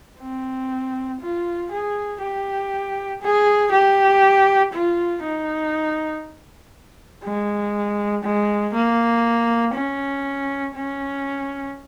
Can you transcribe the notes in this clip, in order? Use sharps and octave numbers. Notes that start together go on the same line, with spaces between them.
C4
F4
G#4
G4
G#4
G4
F4
D#4
G#3
G#3
A#3
C#4
C#4